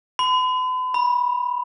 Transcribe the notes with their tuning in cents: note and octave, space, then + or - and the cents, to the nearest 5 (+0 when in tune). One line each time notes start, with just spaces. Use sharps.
B5 +45
B5 -20